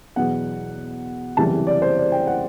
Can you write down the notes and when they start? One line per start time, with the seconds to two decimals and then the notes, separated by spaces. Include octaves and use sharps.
0.16 E2 B2 F#3 B3 F#5
1.37 F#1 E2 C3 E3 G3 A5
1.67 D5
1.82 C5
1.98 D5
2.12 G5
2.27 F#5